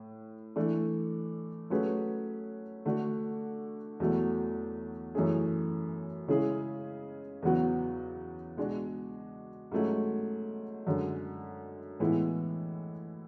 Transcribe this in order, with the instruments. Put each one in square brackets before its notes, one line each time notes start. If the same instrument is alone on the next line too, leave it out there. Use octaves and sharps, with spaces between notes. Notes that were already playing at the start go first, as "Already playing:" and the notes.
Already playing: [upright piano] A2
E3 A3 D4
F#3 A3 C#4 G#4 B4
D3 A3 D4 F#4
E2 B2 F#3 A3
F#2 E3 A3 C#4 G#4
C#3 G#3 C#4 E4 G#4
E2 C#3 F#3 B3 F#4
B2 G#3 D4 F#4
G#2 F#3 A3 C#4
F#2 D3 G#3
A2 E3 G#3 B3 E4